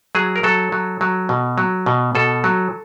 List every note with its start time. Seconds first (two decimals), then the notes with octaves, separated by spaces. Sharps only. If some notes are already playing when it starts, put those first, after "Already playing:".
0.15 F#3 G#4
0.36 A#4
0.43 F#3 A4
0.72 F#3
1.01 F#3
1.29 B2
1.58 F#3
1.86 B2
2.15 B2 A4
2.44 F#3